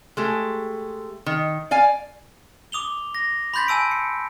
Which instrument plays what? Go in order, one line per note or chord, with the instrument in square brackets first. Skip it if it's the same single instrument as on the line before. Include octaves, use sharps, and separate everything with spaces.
[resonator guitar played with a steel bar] G#3 A3 G4
D#3
D5 F5 G#5
[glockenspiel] D6 D#6 F7 G7
A#6
B5 C6 G6 A6 B6
G#5 A5 E6 D7
C#7